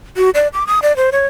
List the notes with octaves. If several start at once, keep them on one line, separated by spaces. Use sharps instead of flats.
F#4
D5
D6
D#6
D5
C5
C#5